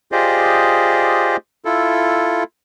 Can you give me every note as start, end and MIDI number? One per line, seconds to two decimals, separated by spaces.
0.12 1.36 65
0.12 1.36 67
0.12 1.36 68
0.12 1.36 72
0.12 1.36 74
0.12 1.36 75
1.65 2.43 64
1.65 2.43 65
1.65 2.43 69